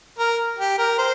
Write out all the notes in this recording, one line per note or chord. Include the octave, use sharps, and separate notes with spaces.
A#4
G4
A#4
C5